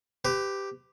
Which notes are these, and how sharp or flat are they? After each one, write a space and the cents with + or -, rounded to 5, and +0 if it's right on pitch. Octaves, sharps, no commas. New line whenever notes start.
G4 +0 B4 +35